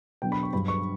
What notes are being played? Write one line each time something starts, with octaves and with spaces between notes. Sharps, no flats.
B2 F#3 B3 D4 G5
B5
C#6
G2 F#3 B3 B5
C#6